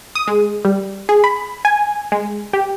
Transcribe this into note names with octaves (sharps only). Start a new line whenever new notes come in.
D#6
G#3
G3
G#4
B5
G#5
G#3
G4